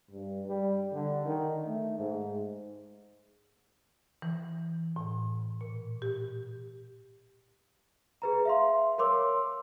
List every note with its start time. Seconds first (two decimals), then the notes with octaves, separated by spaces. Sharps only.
0.10 G2
0.47 G3
0.93 D3
1.25 D#3
1.67 A3
1.99 G#2
4.22 E3
4.96 A2
5.61 A#2
6.02 G4
8.22 G#4 B4 A#5
8.45 E5 F5 C6
8.98 A#4 C#5 C6 D6 E6